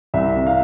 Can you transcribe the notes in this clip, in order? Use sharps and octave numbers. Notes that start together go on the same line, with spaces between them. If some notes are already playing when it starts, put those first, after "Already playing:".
C2 E5
C3
F5